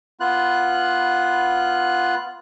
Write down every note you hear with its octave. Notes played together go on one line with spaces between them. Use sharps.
B3 F4 F#6